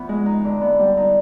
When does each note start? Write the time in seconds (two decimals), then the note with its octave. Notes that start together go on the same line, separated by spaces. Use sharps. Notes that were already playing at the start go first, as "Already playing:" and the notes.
Already playing: E3 F3 B3
0.09 G#3
0.26 D#4
0.45 D3
0.61 B3
0.79 G3
0.97 D#4